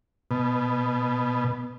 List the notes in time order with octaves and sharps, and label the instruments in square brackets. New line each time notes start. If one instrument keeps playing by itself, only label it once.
[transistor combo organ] B2